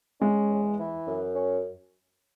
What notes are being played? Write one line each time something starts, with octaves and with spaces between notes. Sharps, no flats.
G#3 C#4
E2
E3
F#2
C#4